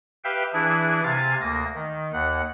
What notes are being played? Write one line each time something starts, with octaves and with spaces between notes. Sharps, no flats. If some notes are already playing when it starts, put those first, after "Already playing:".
G4 B4 E5 F5 G5
E3 D4 E4 G#4
C3 F5 G#5 A6
D2 A#3 A#6
D#3
D#2 F#5